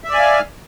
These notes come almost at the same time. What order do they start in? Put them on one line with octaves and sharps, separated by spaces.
E5 D5 G#5 F5